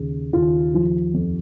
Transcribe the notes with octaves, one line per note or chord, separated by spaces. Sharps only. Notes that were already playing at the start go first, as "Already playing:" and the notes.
Already playing: D#2 C#3
D#2 F4
F3
F2